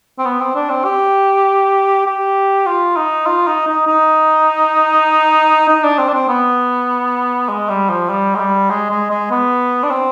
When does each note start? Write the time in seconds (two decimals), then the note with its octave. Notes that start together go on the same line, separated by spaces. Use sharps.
0.19 C4
0.25 B3
0.40 C4
0.55 D4
0.70 C4
0.85 G4
2.06 G4
2.66 F4
2.97 D#4
3.27 F4
3.47 D#4
3.67 D#4
3.87 D#4
5.68 D#4
5.83 D4
5.98 C4
6.09 D4
6.14 C4
6.28 B3
7.49 G#3
7.69 G3
7.90 F3
8.10 G3
8.35 G#3
8.40 G3
8.70 G#3
8.90 G#3
9.11 G#3
9.31 B3
9.84 D4
9.91 C4